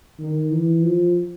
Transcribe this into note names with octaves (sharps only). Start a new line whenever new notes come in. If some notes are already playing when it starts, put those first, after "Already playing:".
D#3
E3
F3